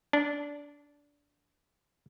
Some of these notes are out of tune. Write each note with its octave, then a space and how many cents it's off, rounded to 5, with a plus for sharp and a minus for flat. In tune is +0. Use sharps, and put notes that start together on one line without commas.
D4 -20